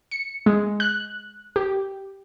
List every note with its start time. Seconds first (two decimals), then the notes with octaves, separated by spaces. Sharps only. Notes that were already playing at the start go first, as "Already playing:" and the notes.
0.11 C#7
0.46 G#3
0.80 F#6
1.56 G4